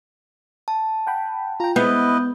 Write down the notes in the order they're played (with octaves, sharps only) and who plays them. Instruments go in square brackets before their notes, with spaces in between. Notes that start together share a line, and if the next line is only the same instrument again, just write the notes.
[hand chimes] A5
[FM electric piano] F#5 G5 B5
[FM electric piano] F4 G5 [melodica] A#5
[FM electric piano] G#3 [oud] B3 [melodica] E4 B4 D#5 [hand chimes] G6